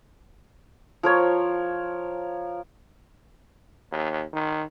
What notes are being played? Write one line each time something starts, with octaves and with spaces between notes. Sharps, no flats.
F3 A#4 C#5
D#2
D#3